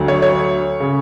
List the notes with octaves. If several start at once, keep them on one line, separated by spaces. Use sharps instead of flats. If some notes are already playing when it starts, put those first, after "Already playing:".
Already playing: D2 D3 F#3
C#5
C#5
C#3